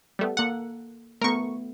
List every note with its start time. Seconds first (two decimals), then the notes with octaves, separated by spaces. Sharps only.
0.19 G3 A3 B3
0.37 A#3 A4 F#5
1.21 A3 B3 A#4 C#6